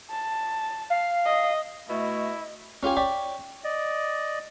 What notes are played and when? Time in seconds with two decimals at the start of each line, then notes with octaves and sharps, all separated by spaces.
0.10 A5
0.90 F5
1.25 D#5
1.89 B2 A3 E4 D#5
2.83 C#4 F4 G4 G#5
2.96 C#5 D5 G5 B5
3.64 D5 D#5